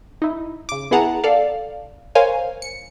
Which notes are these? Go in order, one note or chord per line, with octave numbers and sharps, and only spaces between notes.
D#4 E4
C#3 D6
B3 E4 G#4 F#5 A5 A#5
A4 D5 F5
A#4 C5 C#5 F5 G#5
C#7